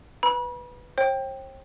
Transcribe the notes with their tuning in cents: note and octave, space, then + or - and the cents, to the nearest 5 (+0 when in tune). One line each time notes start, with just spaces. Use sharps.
B4 +0 B5 -35
C5 +45 G5 +0